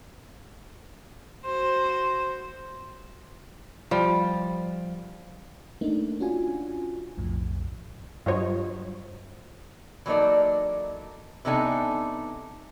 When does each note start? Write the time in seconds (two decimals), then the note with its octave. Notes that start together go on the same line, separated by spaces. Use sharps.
1.46 F#4 C5
3.91 F3 G3
5.81 A3 A#3 D4 D#4
6.20 C#4 D4 F4 F#4 G#5
7.17 B1 F2 A2
8.26 G2 F#3 F4 C5 C#5 D#5
10.06 E3 F#3 A#3 D#4 A4 D5
11.45 C3 B3 D4 D#4 A4 G#5